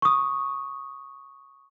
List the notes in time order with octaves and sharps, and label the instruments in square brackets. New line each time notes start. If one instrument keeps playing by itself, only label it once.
[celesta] C#6 D#6